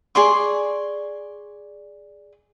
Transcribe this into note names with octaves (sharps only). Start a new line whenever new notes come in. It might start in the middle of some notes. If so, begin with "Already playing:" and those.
G#4 D5 C6 C#6